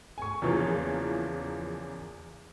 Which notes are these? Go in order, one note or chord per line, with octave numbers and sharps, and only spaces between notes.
G#5 C#6
E2 C#3 E3 F3 A#3